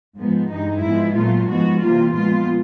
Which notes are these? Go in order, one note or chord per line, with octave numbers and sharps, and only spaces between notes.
G#2 F3 G#3 B3
G2 E3 G#3 D#4
G#2 F3 G#3 B3 E4
A#2 F#3 A3 F4
G#2 F3 G#3 B3 F#4
C3 E3 G3 A#3 F4
A#2 F3 G#3 B3 F4